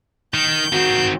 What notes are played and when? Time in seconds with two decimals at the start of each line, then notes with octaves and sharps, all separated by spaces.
0.34 D#3 G6
0.73 D#3 C4 F#4